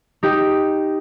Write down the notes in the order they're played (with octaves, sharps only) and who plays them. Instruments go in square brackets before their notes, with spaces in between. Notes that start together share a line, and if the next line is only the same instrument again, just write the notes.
[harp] D#4 G4